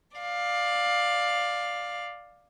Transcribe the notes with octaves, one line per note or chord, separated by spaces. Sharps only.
D5 F5